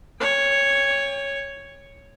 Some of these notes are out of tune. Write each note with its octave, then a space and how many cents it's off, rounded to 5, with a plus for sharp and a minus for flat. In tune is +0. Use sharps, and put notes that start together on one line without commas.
C#5 +0 G5 +40